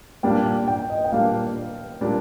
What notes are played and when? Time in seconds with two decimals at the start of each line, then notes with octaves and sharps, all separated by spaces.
0.23 A#2 G3 A#3 D4 G5
0.46 G5
0.68 G5
0.90 D#5
1.04 G5
1.12 A#2 G3 A#3 D4 F5
2.01 A#2 G3 A#3 D4